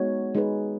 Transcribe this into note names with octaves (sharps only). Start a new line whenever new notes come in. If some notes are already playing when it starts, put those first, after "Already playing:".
Already playing: G#3 B3 D#4 F#4 C#5
G#3 D#4 G#4 B4